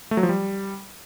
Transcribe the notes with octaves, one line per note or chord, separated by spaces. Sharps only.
A3
F#3
F3
G3